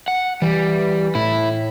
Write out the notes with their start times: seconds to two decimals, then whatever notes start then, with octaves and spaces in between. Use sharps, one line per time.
0.08 F#5
0.42 E3 G3
1.15 A2 E4